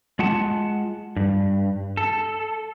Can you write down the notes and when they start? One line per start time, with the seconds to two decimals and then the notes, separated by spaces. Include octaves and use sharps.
0.19 G#3 F4 F#5 A5
1.17 G2
1.97 A4